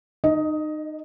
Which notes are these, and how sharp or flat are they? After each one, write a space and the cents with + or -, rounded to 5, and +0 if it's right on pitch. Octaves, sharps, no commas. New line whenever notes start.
D#4 -25 D#5 +10